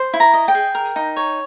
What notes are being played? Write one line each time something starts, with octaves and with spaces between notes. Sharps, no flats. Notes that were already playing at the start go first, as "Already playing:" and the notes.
Already playing: C5
E4
A#5
D#5
G5
G#4
A#4
D#4
C#5